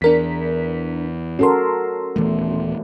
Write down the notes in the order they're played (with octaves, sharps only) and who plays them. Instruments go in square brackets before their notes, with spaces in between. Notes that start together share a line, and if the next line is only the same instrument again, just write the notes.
[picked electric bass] E2 [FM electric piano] D4 A#4 B6
[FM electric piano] C#4 C6 [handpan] F#4 A4 A#4
[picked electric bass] D#1 E3 B3 [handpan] A3